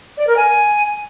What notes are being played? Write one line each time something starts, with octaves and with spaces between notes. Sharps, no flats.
D5
A#4
G#5